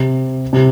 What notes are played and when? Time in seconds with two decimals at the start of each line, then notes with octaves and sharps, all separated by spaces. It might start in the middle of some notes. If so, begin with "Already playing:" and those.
Already playing: C3
0.53 C3